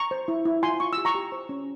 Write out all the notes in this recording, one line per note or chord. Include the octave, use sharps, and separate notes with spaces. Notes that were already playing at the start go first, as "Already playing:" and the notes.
Already playing: A#5 C#6
C5
E4
E4
F4 G#5 C6
F4 C#6
G4 E6
A#5 C#6
G4
C5
C#4